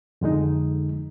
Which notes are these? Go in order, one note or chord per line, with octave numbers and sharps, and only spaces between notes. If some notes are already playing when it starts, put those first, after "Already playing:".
F2 D3 G#3 D#4